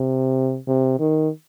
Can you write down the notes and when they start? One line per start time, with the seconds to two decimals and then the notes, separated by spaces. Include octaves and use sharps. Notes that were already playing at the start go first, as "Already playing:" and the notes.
Already playing: C3
0.68 C3
1.00 D#3